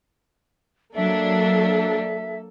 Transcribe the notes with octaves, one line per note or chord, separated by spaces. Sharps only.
F#3 A#3 D4 A4 E5